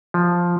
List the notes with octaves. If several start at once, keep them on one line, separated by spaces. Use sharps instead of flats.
F3